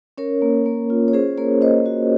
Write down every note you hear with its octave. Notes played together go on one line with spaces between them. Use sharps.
C#4 A#4 C#5
A#3
A#3
F4
C#5
C#4 G#4 C5
A#3 A#4 C#5
A#3 C5 D#5
F#4